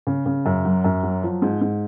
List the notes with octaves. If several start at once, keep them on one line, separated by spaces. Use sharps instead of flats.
C#3
C#3
F#2
F#3
F#2
F#3
F3
G#2
G#2